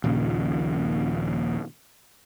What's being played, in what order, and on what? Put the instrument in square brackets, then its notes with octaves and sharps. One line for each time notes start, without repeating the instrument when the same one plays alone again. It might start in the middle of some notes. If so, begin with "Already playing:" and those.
[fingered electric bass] D#1 A#1 A#2 C#3